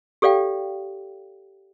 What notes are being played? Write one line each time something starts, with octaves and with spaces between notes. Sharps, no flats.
G4 A4 D5 F5 G5